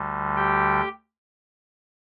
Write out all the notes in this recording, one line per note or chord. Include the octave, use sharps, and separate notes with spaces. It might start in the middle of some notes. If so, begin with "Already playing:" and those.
Already playing: D2 D3 G3
G4 G5